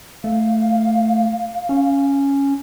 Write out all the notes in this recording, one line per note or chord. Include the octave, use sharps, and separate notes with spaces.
A3 F5
C#4